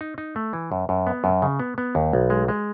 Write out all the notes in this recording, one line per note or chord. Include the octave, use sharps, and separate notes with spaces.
D#4
D#4
A3
E3
F#2
F#2
B3
F#2
C#3
B3
B3
D#2
B1
G#3
G#3